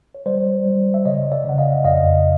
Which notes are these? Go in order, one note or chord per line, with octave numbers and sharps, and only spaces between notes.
C#5
G3 C5 D5
G3
E5
C#3 C#5 D#5
D5 E5
C#3 F#5
D#5 F5
F2 D#5 F5